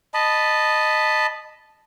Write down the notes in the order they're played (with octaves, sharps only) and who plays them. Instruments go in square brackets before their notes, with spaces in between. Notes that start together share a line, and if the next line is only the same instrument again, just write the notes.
[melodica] D#5 A5 B5